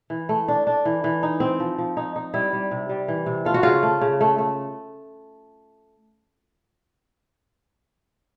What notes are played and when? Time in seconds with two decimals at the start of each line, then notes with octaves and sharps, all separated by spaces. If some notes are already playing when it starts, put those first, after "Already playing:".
0.10 E3
0.29 A3
0.48 D4
0.67 D4
0.85 E3
1.04 E3
1.23 D#4
1.40 C4
1.60 F3
1.78 F3
1.97 D#4
2.16 D#4
2.34 G3 E4
2.53 G3
2.71 C3
2.89 G3
3.08 E3
3.26 C3
3.45 A3 F4
3.54 F#4
3.63 C#3 F4
3.83 A3
4.01 C#3
4.21 A3
4.38 A3